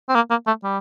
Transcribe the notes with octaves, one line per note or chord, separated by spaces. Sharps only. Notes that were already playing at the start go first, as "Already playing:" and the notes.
C4
A#3
A#3
A3
G3